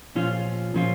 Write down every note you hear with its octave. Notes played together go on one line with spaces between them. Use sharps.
A#2 F3 C#4 F4
A#2 F3 C#4 F4